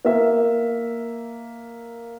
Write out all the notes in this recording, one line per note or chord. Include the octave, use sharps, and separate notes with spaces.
A#3 E5